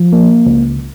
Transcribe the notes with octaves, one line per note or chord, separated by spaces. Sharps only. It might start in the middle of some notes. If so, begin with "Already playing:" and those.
Already playing: F3
A#3
C#2